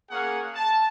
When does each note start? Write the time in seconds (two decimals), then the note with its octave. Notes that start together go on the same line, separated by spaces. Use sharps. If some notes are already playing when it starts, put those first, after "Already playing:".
0.10 A#3 C#4 G#4 F#5
0.54 A5